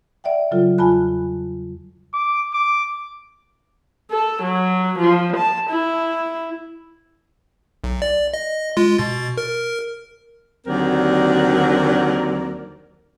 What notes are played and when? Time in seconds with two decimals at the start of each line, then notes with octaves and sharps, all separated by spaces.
0.24 D5 E5 F#5 G5
0.51 C#3 F#3 G3 F4 A4
0.78 E2 F4 G#5 A5 B5 F#6
2.13 D6
2.53 D6
4.11 A4
4.42 F#3
4.98 F3
5.36 A5
5.70 E4
7.84 B1
8.02 D5
8.34 D#5
8.77 G#3 F4
8.98 B2 A6
9.37 A#4
10.67 D#2 D3 F#3 C4 A#4 D5